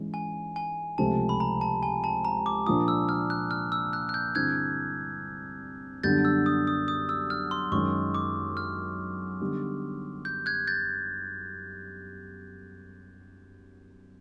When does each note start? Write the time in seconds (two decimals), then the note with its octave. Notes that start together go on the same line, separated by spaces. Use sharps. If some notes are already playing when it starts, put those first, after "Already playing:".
Already playing: G#2 E3 G#3 C#4
0.14 G#5
0.56 G#5
0.98 C#2 C3 F3 A3 A5
1.29 B5
1.40 A#5
1.61 A5
1.83 G#5
2.04 A5
2.25 A#5
2.46 D6
2.67 A#2 F3 A#3 D4 F4 D#6
2.88 E6
3.09 F6
3.30 F#6
3.51 F6
3.72 E6
3.93 F#6
4.09 F#6
4.14 G6
4.35 G2 D3 G3 C4 E4 F#6 G#6
6.03 F#2 D3 G3 B3 D4 G6 A6
6.25 E6
6.46 D#6
6.67 D#6
6.88 D#6
7.09 E6
7.30 F6
7.51 C6
7.72 F#2 D#3 G#3 C#4 C#6
8.14 D6
8.57 F6
9.40 D3 G3 B3 D#4
10.25 G6
10.46 F#6 G#6
10.67 G6 A6